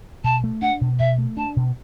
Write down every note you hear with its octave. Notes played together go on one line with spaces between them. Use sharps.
B2 A5
A3
D4 F#5
B2
B2 E5
A3
D4 A5
B2